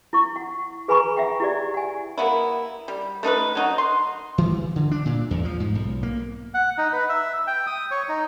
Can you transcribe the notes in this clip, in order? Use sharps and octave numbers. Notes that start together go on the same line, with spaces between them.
E4 C#6
F#5
G#4 B4 G#5 A#5 B5 C#6
E5 F#5 G5
E4 G4 D5
F#5 G#5
A#3 B3 E4
G3
A3 D#4 A#4 B4
F#3 D#4 F#4
C6
E3
D3
D4
A#2
E2
F3
G#2
B1
A#3
F#5
D#4
B4
E5
G5
D#6
C#5
D#4